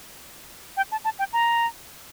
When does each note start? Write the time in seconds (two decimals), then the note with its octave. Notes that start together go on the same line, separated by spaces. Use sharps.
0.77 G5
0.92 A5
1.04 A5
1.19 G5
1.33 A#5